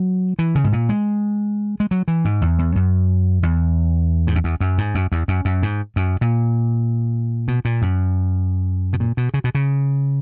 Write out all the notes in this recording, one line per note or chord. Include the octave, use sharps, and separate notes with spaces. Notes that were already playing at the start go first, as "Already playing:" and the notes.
Already playing: F#3
E3
C#3
G#2
A#2
G#3
G#3
F#3
E3
G#2
E2
E2
F#2
E2
G#2
F#2
E2
F#2
G#2
F#2
E2
F#2
F#2
G#2
F#2
A#2
B2
A#2
F#2
B2
A#2
B2
C#3
B2
C#3